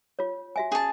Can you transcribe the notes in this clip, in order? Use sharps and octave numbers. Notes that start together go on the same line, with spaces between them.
F4 C#5
F#4 E5 G#5
C#4 G#4 A5